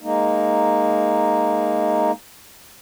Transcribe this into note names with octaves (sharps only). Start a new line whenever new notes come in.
G#3 A#3 D#4